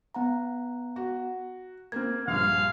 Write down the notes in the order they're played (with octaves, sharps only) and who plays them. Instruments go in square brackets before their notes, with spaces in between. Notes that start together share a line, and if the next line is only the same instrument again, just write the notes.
[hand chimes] B3 F#5 A#5
[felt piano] F#4
[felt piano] A#3 C4 [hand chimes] F6 G#6
[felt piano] A#1 G2 [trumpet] F5